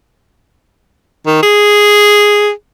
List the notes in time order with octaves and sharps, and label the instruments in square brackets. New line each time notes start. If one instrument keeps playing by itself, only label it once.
[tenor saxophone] D#3
G#4